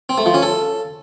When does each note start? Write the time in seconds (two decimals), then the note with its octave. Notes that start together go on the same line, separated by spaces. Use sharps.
0.09 C4
0.18 A3
0.26 F3
0.34 C#4
0.42 A4